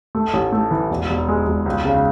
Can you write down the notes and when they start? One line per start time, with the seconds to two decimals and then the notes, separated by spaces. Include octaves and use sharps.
0.15 A3
0.33 A1
0.53 A3
0.71 E3
0.90 E1
1.10 E1
1.28 G#3
1.47 E1
1.66 C#2
1.85 C#3